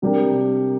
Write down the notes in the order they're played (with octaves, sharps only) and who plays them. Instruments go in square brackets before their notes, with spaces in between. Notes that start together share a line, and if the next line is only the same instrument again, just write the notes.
[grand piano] C3 G3 D4 G4 A#4